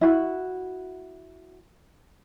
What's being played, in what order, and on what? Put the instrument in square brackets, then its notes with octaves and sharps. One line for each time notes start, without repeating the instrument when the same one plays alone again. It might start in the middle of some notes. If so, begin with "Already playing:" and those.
[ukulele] E4 F#4